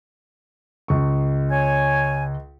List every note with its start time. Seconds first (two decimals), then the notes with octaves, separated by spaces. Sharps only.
0.88 C#2 C#6
1.52 C#5 G#5